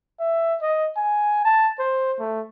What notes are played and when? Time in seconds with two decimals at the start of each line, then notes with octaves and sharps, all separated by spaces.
0.20 E5
0.61 D#5
0.97 G#5
1.45 A5
1.79 C5
2.20 A3